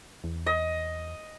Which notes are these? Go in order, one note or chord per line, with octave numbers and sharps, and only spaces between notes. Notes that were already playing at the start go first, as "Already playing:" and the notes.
E2
D#5